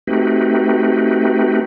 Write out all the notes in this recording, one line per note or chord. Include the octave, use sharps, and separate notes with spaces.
A3 C4 D#4 F#4 G4 B4